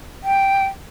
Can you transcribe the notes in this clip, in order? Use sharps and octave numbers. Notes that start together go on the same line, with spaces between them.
G5